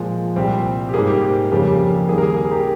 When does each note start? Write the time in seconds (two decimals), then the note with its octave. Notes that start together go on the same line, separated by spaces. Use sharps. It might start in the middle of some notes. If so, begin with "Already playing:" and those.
Already playing: A#2 F3 G#3
0.36 C2 A#2 G3 C4 G4
0.89 G4
0.94 G#2 G3 A#3 G#4
1.08 G4
1.51 F2 C#3 G3 A#3 G4
2.08 D#2 D#3 G3 A#3 G#4
2.18 A#4
2.23 G#4
2.37 G#4
2.51 G4 A#4